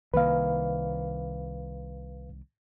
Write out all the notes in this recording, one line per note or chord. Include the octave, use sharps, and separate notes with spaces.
C2 D#3 A#3 B4 F5